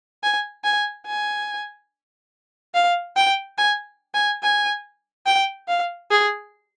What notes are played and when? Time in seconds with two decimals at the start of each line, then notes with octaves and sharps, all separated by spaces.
0.23 G#5
0.64 G#5
1.07 G#5
2.74 F5
3.16 G5
3.58 G#5
4.14 G#5
4.43 G#5
5.26 G5
5.68 F5
6.11 G#4